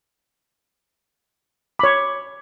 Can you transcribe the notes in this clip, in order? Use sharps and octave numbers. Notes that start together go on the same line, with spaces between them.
C#5 B5 D6